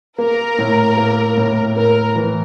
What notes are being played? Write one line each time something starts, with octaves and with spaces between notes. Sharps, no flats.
A#3 A#4
A2
A#3
A2
A#3 A#4
E3